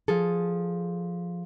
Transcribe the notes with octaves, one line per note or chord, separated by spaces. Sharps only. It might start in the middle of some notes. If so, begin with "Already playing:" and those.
F3 G#4 A4